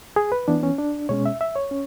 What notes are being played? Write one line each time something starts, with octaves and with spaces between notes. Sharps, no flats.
G#4
B4
E3 B3 D4
C#4
D4
B2 G#3 C#4 C#5
E5
E5
C#5
C#4